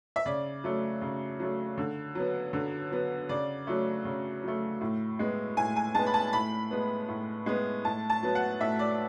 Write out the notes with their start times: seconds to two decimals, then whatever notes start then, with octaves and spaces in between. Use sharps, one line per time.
0.16 E5
0.26 C#3 D5
0.64 F#3 A3
1.02 C#3
1.40 F#3 A3
1.78 D3
2.15 F#3 B3
2.53 D3
2.91 F#3 B3
3.29 C#3 D5
3.67 F#3 A3
4.05 C#3
4.43 F#3 A3
4.81 A2
5.19 G#3 B3
5.57 A2 G#5
5.76 G#5
5.95 G#3 B3 A5
6.07 B5
6.14 A5
6.33 A2 B5
6.70 G#3 B3
7.08 A2
7.46 G#3 B3
7.85 A2 A5
8.10 A5
8.23 F#3 B3
8.35 F#5
8.60 A2 E5
8.79 D5